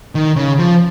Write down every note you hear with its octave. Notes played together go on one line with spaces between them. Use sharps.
D#3
C#3
F3